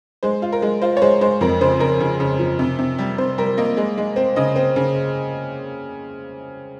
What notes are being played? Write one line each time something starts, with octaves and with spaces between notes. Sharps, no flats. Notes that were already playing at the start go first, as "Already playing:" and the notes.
G#3 C5
F4
A#4
G#3
F4 C5
C#5
G#3 C5
G#3 C5
F2 A#4
C#3 C5
C#3 A#4
C#3
C#3
F3
C3
C3
G3
C3 C5
G3 A#4
A#3 D#5
G#3
G#3
C4
C#3 D#5
C4
C#3